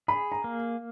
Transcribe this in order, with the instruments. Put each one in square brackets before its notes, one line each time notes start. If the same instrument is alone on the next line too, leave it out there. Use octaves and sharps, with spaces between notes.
[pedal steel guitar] G#4 [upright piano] B5
[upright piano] A#5
[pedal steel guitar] A#3